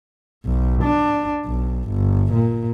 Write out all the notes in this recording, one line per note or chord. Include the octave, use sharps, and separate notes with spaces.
B1
D4
B1
G1
A#2